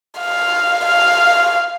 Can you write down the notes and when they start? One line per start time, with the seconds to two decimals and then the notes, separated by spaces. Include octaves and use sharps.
0.19 F5
0.86 F5